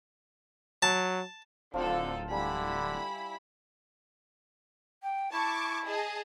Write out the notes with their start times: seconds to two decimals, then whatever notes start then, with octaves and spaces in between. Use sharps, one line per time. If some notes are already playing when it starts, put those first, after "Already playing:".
0.83 F#3 A5
1.74 D1 D3 F3 C4 D#4 F4 A4
2.31 D3 G3 E4 G#5 B5
5.02 G5
5.32 E4 A5 C#6 D6
5.86 G#4 D#5 A5